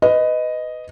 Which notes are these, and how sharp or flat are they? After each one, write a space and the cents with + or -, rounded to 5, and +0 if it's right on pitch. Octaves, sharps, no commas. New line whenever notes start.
B4 +20 D#5 +0